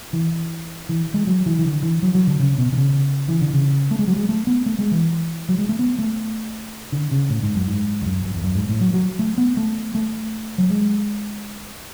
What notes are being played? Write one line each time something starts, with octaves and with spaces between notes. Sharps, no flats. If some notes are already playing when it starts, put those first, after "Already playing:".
E3
E3
G#3
F#3
E3
E3
D3
E3
F#3
F#3
D3
C#3
B2
D3
C#3
E3
D3
C#3
A3
G#3
F#3
G#3
A3
B3
A3
G#3
E3
F#3
G#3
A3
B3
A3
D3
C#3
A2
G#2
F#2
G#2
E2
F#2
F#2
E2
F#2
G#2
A2
F#3
F#3
A3
B3
A3
A3
F#3
G#3